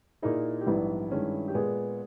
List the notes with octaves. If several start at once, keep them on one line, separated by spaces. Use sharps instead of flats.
A#2 A#3 D#4 E4 G#4
G4
A#1 G#2 E3 G3 B3 E4
G2 D#3 G#3 C#4
G4
A#2 G#3 B3 G#4